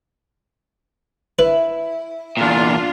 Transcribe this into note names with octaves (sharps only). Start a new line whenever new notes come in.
E4 B4
E2 A#2 D4 F4